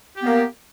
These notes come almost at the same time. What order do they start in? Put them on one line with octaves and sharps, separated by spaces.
G4 B3 A#3